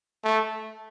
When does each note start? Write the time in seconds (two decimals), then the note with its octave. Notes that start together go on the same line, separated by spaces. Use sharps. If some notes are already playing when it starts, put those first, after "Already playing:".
0.24 A3